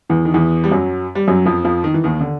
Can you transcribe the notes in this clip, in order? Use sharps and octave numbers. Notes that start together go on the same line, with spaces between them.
E2 E3
D#3
E2 E3
G3
F#2 F#3
G3
F#2 F#3
F2 F3
F2 F3
D#3
E3
D#2 D#3
D3